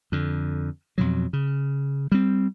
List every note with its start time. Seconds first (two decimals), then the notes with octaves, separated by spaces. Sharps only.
0.12 F2 D3
0.98 F2 B2 F#3
1.33 C#3
2.12 G3 C4